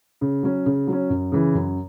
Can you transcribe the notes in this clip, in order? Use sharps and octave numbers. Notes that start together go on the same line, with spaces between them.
C#3
F#3 C#4
C#3
F#3
C#4
F#2
C#3 E3
F#2